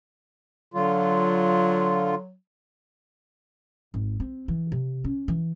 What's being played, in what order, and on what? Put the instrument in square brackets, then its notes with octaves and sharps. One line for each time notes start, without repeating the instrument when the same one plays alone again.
[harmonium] D3 F4 [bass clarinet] F#3
[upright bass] G#1
C4
E3
C3
C#4
E3